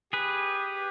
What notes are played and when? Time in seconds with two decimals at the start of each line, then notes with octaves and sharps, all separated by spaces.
0.13 G4 G#4 B4